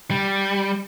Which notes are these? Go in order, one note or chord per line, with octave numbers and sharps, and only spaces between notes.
G3